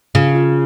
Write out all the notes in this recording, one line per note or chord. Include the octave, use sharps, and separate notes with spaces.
C#3 F3
F4